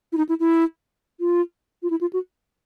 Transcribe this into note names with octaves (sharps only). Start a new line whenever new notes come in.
E4
D#4
E4
E4
F4
F4
E4
F4
F#4